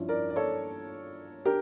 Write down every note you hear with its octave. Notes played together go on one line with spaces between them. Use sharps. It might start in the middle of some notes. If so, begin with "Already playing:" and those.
Already playing: G2 F3 C#4 E4
A#4 D5
D5
A4 C#5
D4 G4 A#4